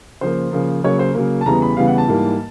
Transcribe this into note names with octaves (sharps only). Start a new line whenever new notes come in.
C#3 F3 A#3 C5
C#3 F3 A#3
C#3 F#3 A#3 C#5
C5
C#3 F#3 A#3
A5
E2 C#3 E3 G3 B3 A#5
B5
E2 C#3 E3 G3 B3 F5
F#5
A5
G#2 E3 G3 A#3